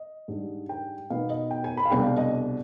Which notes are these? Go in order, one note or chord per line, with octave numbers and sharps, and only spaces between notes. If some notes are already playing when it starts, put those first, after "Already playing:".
Already playing: D#5
G#2 G3 D4
G5
B2 B3 D#4 F5
D#5
G5
G#5
B5
F5
C2 B2 G#3 D4 G5
F5
D#5
D5